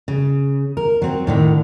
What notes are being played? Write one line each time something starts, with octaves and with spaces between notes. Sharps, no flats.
C#3
A#4
F#3 C4
A2 D3 D#3